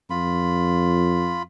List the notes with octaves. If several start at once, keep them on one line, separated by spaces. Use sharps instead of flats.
F2 F4 B5